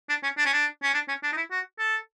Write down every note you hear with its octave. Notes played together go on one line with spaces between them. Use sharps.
D4
C#4
D4
C#4
D4
C#4
D4
C#4
D4
D#4
E4
F#4
A4